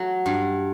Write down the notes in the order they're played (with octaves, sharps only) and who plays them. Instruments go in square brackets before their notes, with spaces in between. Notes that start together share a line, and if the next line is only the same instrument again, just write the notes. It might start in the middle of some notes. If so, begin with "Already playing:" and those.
Already playing: [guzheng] F#3 A3
G2